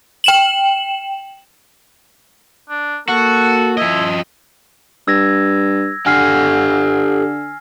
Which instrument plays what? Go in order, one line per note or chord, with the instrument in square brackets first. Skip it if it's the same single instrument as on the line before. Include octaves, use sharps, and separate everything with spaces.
[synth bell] G5 E7 F#7
[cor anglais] D4
[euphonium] A#3 [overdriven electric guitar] F#4 [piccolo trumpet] A4 [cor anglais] F#5
[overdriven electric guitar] F3 D#5 [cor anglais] E4
[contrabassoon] G2 [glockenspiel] E6 G#6 A#6
[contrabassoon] D3 [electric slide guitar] G4 A4 F#5 [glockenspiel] G#5 F6 C7